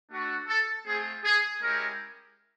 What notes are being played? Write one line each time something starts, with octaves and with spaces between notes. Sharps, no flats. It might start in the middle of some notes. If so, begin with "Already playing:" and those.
A3 D4 F#4
A4
A3 C4 F4 G#4
G#4
G#3 C#4 E4 G4 A#4